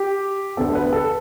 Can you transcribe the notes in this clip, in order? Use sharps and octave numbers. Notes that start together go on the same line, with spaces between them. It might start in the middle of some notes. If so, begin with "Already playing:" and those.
Already playing: G4
D2 D3 B3 A4
B4
A4